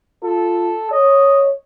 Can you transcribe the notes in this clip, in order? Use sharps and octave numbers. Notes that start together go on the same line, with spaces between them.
F4 A4
C#5 D#5